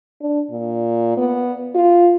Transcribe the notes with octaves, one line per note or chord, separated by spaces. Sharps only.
D4
A#2
B3
F4